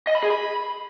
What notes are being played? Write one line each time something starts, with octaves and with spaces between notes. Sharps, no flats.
D#5
B5
G#4
B5